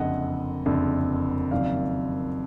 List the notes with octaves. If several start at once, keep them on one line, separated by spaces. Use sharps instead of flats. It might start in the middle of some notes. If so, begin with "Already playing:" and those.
Already playing: F#1 F2 D3 D#5 F#5
F#1 F2 D3
F#1 F2 D#3 F#3 D5 F5